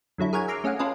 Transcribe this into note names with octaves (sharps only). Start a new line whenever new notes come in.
F#2 D3 F#3 E4
G#4 A#4 C#5 F#5 G#5
E5 A#5 C6 D6 F6
A3 C#4 G#4 F5 F#5
C#4 F4 A4 B4 D#5